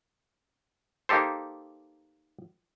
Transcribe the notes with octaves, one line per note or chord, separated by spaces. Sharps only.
A#3 D#4 G4 A4 C5